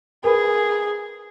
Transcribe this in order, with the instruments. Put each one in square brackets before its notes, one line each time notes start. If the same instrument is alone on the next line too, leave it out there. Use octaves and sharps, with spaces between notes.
[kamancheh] G#4 [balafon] A#4 B4 B5